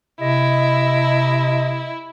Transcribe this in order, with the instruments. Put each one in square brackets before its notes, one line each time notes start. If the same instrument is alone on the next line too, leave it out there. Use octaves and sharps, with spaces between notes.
[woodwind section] C3 D#5 [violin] E4